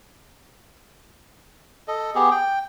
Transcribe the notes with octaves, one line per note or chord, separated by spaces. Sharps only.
A4 D#5
B3 G4 G#4
G5